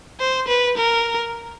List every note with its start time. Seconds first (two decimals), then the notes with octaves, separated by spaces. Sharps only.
0.20 C5
0.48 B4
0.77 A#4